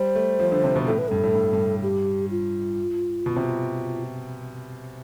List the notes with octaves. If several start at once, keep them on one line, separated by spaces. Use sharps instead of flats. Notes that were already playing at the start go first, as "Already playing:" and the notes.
Already playing: G3 C5
A3
F3
D3
C3
B2
A2 A4
A2 B4
G2 A4
A2
G2
G2
G4
F4
B2
C3